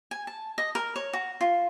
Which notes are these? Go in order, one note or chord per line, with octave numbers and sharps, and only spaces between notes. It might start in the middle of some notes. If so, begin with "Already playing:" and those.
G#5
A5
D#5
A#4
C#5
F#4
F4